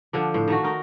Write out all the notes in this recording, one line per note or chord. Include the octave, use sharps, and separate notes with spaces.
D3 F3 D4
A2 C5
D#3 A3 F#4
D#4 A#4